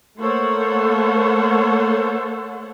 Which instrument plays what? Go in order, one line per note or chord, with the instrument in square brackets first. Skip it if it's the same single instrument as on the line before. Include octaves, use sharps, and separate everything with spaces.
[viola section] A3 A#3 A4 C5 C#5 F#5